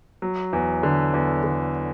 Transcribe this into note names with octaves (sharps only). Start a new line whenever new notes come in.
F#3
E2
D3
E2
D3